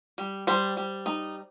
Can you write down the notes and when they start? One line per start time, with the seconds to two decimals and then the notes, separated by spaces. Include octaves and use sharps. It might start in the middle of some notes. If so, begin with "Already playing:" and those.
0.18 G3
0.47 G3 C5
0.77 G3
1.06 D#4